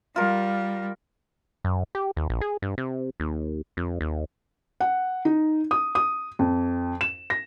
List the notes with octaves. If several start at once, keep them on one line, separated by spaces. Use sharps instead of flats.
G3 F4 A#4
F#2
G4
D#2
A#1
G#4
G2
C3
D#2
F2
D#2
F#5
D#4
D#6
D#6
F2
E7
A#6